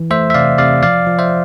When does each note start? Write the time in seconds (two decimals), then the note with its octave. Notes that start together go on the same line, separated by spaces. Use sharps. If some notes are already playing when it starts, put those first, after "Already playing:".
Already playing: E3
0.10 A3 C5 E5
0.30 E5
0.34 C3 D5 F5
0.58 C3 D5 F5
0.83 F3 D5 F5
1.07 F3
1.19 C5 E5